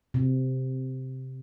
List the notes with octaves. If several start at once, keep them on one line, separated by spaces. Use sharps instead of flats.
C3